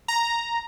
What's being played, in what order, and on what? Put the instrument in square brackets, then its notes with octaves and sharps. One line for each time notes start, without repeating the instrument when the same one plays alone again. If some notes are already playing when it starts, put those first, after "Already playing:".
[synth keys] A#5